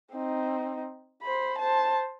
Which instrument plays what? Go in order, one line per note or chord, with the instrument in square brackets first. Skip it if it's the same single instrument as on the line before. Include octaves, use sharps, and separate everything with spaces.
[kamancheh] C4 D#4
C5 B5
C5 A5